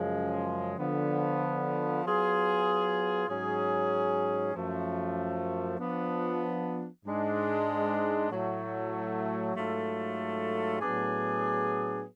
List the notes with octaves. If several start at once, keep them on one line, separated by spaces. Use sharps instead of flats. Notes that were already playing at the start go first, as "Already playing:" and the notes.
Already playing: F#2 C#3 F3 G#3
D3 F3 B3
F#3 B3 F4 G#4
G#2 F#3 C#4 G#4
F#2 F3 A3
F3 B3 D4
G#2 G#3 D4
A2 F#3 A3
G#2 F#3 A3 F4 A4
A2 F#3 B3 D4 G#4